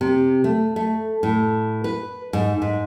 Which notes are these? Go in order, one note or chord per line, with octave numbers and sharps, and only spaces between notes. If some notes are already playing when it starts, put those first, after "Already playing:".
C3
A3
A3
A2
B4
G#2
G#2